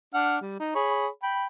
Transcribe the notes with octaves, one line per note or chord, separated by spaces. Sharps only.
D4 F#5 F6
G3
D#4
G#4 C#5 B5
G5 B5